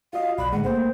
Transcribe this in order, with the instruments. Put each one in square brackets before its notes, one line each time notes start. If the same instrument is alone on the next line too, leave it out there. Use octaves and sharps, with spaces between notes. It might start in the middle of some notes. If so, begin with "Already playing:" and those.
[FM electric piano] F4 F#4 D#5 [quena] F5
[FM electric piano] B1 D5 F#6 [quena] B5
[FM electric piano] A2 D3 G#3 [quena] F#5
[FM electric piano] A3 A#3 G5 [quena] C5